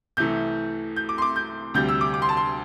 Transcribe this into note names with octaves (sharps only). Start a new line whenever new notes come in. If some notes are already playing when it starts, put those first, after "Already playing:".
C2 C3 E3 A3 G6
G6
D6
C6
D6
G6
D2 C3 G3 G6
E6
D6
D6
C6
A5
C6